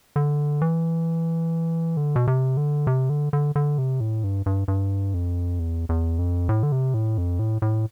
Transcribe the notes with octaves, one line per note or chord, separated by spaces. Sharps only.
D3
E3
D3
B2
C3
D3
C3
D3
D3
D3
C3
A2
G2
G2
G2
F2
E2
E2
F2
A2
D3
C3
A2
F2
A2
A2